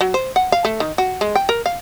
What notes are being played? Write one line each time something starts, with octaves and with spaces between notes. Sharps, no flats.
F#3
C5
F#5
F5
A3
D#3
F#4
G#3
G5
A#4
F5